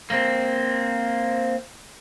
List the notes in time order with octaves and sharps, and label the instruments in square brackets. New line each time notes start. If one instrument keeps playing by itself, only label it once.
[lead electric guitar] A#3 C4